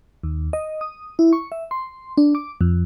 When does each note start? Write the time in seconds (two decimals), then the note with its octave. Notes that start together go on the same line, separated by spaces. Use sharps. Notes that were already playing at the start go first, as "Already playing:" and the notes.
0.23 D#2
0.53 D#5
0.81 D#6
1.19 E4
1.33 C#6
1.52 E5
1.71 C6
2.17 D4
2.35 D6
2.61 F2